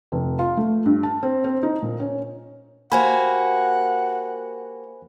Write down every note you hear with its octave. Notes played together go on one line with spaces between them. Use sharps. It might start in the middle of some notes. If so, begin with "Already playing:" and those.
F1
F4
A3
G2
A5
C4
C4
D#4
A#2
C#4
A#3 F#4 G4 C5 F#5 G#5 B5